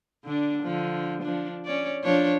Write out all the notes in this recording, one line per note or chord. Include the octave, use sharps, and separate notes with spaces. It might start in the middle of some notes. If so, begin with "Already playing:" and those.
D3 D4
D3 F3
F3 D4
C#4 C#5 D5
F3 D4 C#5